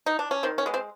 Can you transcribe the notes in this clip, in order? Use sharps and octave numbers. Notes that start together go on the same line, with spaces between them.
D#4
D4
C#4
D#3 C4
C#4
G#3 B3
C4